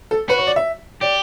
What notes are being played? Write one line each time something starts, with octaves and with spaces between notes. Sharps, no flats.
A4
F#4 B4
C#5
D5
E5
G4 D5